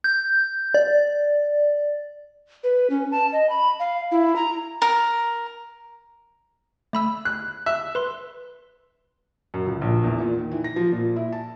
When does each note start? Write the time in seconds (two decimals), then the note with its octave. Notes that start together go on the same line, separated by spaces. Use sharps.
0.04 G6
0.74 D5
2.64 B4
2.90 C#4
3.11 A5
3.33 D#5
3.50 B5
3.79 F5
4.12 E4
4.36 A#5
4.82 A#4
6.93 A3 B5 E6
7.25 F#6
7.66 E5 F#6
7.95 B4 C6
9.54 F#2
9.67 C#2
9.82 A#1
10.04 E2
10.20 A#2
10.39 D#3
10.52 E3
10.64 A#6
10.76 F3
10.92 A#2
11.16 E4
11.32 A5